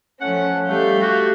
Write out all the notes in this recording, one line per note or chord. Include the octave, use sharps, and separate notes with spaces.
F3 A3 C#4 F#5
G3 A3 F5 G6
F#4 G4